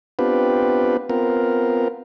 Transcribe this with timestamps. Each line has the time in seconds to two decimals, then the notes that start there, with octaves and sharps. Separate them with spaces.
0.19 B3 C4 D4 F4 G4 B4
1.10 B3 C4 F4 A#4